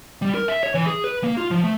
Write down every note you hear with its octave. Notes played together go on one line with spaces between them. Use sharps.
G3
A#4
E5
C#5
E3
G#4
B4
A#3
F4
F3
A3